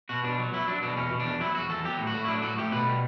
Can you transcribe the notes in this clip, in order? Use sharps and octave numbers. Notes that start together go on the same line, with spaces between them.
B2 F#4
B2 D4
F#3
F#3 E4
F#3 D4
B2 D4
E2 C#4
B2
D4
E2
F#3 E4
E2 F#4
E2 A4
F#3 G4
A2
F#4
A2
E4
F#3 D4
A2 F#4
A2 G4
B2 B4
G3